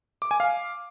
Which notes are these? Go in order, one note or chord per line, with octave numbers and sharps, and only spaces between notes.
D6
G#5
F5